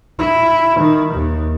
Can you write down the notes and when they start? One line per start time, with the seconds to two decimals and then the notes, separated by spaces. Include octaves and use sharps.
0.19 E4
0.80 D#3
1.14 D#2